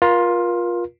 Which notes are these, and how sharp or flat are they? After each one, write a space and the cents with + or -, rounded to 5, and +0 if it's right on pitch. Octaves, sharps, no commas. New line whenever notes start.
F4 +10 A#4 +35